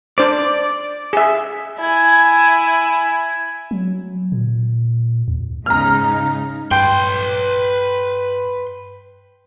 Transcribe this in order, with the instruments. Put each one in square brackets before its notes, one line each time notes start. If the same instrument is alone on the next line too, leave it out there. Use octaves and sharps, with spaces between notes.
[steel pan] D4 C5 D6 [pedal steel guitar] D5
[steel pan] G#4 E5
[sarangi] E4 [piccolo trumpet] G#5
[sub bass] F#3
A#2
D#2
[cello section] G#2 C#3 D#4 [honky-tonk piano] A#5 F6
[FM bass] G2 [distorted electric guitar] B4 C6 [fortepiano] G5